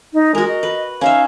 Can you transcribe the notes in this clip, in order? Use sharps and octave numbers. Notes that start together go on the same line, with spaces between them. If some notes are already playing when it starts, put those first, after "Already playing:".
D#4
G#3 F#4 A#4
D#5
B4
C#4 D#4 E5 F5